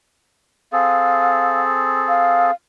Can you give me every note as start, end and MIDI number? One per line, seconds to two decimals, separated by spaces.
0.72 2.51 60
0.72 2.51 68
0.72 2.51 69
0.72 1.61 77
2.08 2.53 77